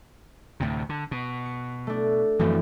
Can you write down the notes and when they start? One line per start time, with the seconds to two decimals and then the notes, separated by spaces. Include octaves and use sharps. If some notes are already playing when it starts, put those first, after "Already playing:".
0.60 D2 A2 C3
0.89 D3
1.11 B2
1.46 C#7
1.87 A3 D4
2.39 F#2 E3 F3 A3 C4